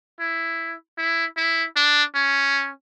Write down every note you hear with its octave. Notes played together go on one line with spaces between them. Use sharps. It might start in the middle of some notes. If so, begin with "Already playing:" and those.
E4
E4
E4
D4
C#4